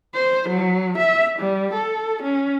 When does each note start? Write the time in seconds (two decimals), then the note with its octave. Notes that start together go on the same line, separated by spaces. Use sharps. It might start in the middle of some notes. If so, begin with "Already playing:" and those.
0.14 C5
0.49 F#3
0.98 E5
1.39 G3
1.74 A4
2.23 C#4